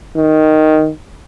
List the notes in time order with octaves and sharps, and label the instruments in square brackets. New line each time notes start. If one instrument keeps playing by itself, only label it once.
[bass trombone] D#3